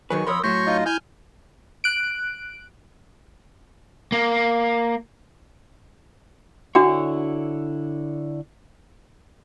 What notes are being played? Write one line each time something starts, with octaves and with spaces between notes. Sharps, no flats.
D#3 F#3 G#4 B4 G#5 C#6
F2 A#4 C#5 B5 C6 D#6 E6
A2 F#3 C#5 C6 C#6 G6 A#6
D#4 F4 D#5
E4 G#5 F6 G6
F#6 D7
A#3
D3 D4 E4 F#4 C#5 F#5